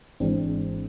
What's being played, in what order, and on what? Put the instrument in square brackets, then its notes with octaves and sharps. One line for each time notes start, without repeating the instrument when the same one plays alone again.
[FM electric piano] G#1 G#2 E3 G#3 C4 D4